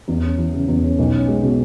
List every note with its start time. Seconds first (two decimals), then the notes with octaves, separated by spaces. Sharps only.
0.08 E2
0.23 C#4
0.38 E3
0.54 C#3
0.68 E2
0.84 C#4
0.99 B1
1.14 C#4
1.28 G#3
1.43 B2